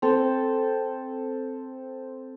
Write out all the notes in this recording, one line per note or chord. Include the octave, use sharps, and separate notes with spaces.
C4 A4